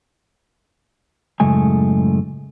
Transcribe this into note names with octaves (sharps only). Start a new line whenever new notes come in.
F#2 A2 C#3 G#3 A3 G#5